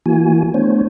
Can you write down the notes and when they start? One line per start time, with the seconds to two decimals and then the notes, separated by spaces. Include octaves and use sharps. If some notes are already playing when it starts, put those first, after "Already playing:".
0.06 E3 A#3 E4 F#4 G#5
0.54 A3 B3 D4 C5 C#5